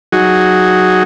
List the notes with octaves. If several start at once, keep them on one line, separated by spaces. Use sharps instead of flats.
F#3 D#4 F#4 G#4